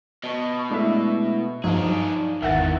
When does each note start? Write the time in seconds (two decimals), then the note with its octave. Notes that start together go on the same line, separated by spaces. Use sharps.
0.24 B2 D#5 A5 C#6
0.70 G#3 A3 D4 E4 E5
1.64 G2 F3 F#3 D4 D#4 G#4 F5
2.42 G#1 E2 D#3 E3 E5 F#5 A6